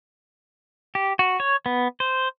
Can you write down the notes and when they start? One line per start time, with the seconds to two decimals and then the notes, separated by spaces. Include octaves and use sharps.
0.95 G4
1.19 F#4
1.40 C#5
1.66 B3
2.00 C5